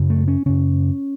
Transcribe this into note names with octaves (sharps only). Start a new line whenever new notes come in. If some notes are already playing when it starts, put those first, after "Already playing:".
Already playing: F#2 C#3
A3
C#4
F#2 C#3 C#4